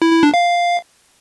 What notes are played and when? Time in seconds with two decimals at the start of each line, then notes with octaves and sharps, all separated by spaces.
0.02 E4
0.12 E4
0.23 D4
0.34 F5